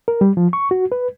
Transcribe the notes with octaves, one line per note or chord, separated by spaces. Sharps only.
A#4
G3
F3
C#6
F#4
B4